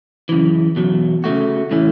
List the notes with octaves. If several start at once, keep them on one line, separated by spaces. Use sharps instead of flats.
F#2 C#3 E3
E2 B2 F#3
C#3 A3 F#4
A2 E3 A3 C#4